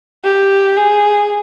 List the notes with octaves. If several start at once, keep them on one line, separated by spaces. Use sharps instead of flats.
G4
G#4